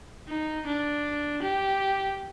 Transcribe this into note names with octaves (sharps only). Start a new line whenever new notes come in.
D#4
D4
G4